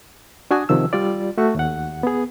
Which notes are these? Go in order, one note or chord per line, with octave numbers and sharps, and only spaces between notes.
D4 F#4 G#5 D#6 G#6
C3 D#3 F3 E6
G3 F4 D5
A3 F#4 C#6
D#2 F#5
B3 G#4